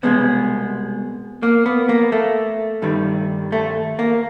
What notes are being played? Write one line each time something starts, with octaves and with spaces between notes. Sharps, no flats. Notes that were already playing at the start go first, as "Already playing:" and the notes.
C2 B2 G#3 B3
A#3
B3
A#3
A3
G2 D#3 G3
A3
A#3